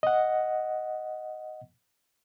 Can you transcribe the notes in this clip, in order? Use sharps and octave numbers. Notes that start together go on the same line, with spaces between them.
D#5 F#5